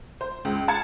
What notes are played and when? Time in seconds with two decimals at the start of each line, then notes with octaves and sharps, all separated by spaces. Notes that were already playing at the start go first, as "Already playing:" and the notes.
0.21 C5
0.45 C#2
0.68 F5 A5 G#6 C#7